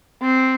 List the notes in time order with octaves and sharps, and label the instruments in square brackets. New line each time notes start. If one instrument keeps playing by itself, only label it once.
[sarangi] C4